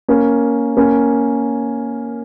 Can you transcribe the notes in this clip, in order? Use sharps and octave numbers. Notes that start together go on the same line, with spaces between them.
A#3 C#4
A#3 C#4